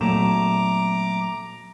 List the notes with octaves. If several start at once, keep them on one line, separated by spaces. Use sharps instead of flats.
A#2 F#3 A3 A#5 D6 E7